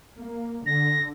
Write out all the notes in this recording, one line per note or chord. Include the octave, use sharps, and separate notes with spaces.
A#3
D3 A#6